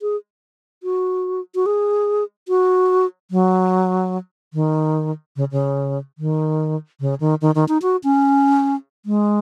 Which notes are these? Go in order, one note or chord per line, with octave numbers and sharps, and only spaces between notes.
G#4
F#4
F#4
G#4
F#4
F#3
D#3
C#3
C#3
D#3
C#3
D#3
D#3
D#3
D#4
F#4
C#4
G#3